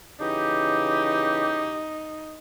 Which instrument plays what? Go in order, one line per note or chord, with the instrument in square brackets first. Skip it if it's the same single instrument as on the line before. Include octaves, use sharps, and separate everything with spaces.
[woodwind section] C#3 E3 G4 [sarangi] D#4